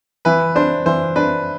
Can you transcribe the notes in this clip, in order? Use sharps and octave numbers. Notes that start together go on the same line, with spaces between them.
E3 B4
D4 C5
E3 C5
D4 B4